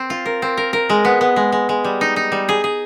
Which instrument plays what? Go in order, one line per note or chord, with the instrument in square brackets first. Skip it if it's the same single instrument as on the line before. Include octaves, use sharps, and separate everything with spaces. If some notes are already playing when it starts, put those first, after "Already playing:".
Already playing: [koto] C4
F4
A#4
C4
A#4
A#4
G#3
B3
B3
G#3
G#3
G#3
G3
D#4
D#4
G3
G#4
G#4